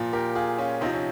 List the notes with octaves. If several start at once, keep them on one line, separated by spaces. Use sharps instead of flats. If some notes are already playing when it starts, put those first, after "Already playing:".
Already playing: A#2 F3
G4 A#4
F4 G#4
C#4 F4
C3 F3 C4 D#4
C#4